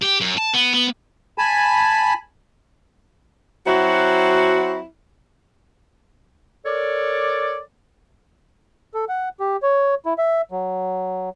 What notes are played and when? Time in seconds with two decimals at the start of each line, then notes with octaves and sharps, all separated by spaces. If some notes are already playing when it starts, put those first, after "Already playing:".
0.03 G4
0.21 F#2
0.38 A5
0.54 B3
0.74 B3
1.38 G#5 A5 B5
3.66 F#3 C4 E4 F#4
6.66 A4 A#4 C#5 D5
8.94 A4
9.09 F#5
9.40 G4
9.63 C#5
10.06 E4
10.18 E5
10.52 F#3